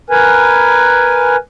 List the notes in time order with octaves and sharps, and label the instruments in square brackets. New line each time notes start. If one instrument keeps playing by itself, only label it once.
[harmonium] A#4 B4 G#5